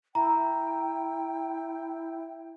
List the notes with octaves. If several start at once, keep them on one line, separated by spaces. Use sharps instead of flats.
E4 G5 A#5